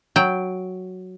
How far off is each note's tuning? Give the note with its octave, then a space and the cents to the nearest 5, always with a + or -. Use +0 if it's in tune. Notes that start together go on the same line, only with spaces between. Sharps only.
F#3 +0 G5 +0